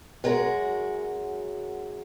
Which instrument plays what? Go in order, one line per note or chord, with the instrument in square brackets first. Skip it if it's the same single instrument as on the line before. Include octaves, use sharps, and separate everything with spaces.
[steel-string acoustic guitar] F#2 G#3 F#4 A#4